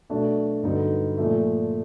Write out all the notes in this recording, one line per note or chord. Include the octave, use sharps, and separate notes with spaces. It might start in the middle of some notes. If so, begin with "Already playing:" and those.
B2 F#3 A3 D4
G2 D3 F#3 B3 D#4
A#2 F3 A3